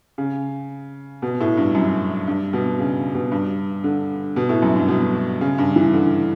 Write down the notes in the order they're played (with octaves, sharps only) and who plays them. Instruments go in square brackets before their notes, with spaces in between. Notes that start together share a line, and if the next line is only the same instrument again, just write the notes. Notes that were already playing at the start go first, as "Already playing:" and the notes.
[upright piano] C#3
B2
A2
G2
F#2
G2
B2
C#3
B2
G2
D3
B2
A2
F#2
G2
B2
C#3
G2
E3
D3